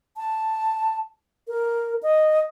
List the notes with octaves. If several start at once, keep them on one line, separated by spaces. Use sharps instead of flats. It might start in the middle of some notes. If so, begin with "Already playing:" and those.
A5
A#4
D#5